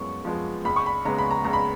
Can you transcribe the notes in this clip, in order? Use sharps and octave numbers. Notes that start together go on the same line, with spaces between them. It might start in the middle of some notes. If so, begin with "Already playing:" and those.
Already playing: F#2 F3 G#3 B3 C#6
F3 G#3 B3
C#2 B5
C#6
B5
C#3 G#3 B3 A#5
B5
A#5
C#2 A#5
B5